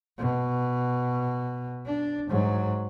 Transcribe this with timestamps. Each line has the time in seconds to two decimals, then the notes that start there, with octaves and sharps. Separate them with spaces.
0.18 B2
1.86 D4
2.29 G#2 F#3